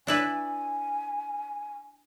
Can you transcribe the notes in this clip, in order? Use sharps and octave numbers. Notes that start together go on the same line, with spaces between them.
D4 E4 B4 G#5